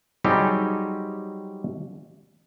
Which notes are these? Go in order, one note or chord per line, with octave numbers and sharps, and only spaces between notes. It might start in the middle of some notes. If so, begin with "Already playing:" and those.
F#3 G3 C4 D#4 G4 G#4